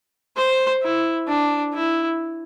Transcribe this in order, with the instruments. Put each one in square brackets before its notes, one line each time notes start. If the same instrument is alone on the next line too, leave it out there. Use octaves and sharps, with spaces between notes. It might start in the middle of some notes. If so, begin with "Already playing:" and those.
[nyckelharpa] C5
E4
D4
E4